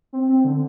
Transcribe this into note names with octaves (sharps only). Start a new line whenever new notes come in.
C4
C4
D3